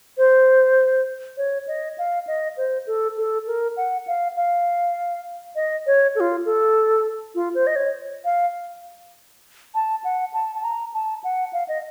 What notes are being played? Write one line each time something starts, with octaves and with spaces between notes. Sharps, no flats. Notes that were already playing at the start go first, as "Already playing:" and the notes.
C5
C#5
D#5
F5
D#5
C5
A4
A4
A#4
F#5
F5
F5
D#5
C#5
A4
F4
A4
F4
C5
D#5
C#5
F5
A5
F#5
A5
A5
A#5
A5
F#5
F5
D#5